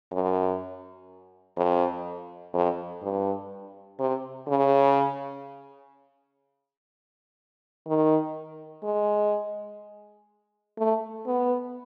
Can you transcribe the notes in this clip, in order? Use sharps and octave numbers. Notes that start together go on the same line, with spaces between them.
F#2
F2
F2
G2
C3
C#3
D#3
G#3
A3
B3